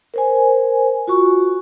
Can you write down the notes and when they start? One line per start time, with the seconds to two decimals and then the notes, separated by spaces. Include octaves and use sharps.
0.14 A#4 C5 G#5
1.07 F4 F#4 C#6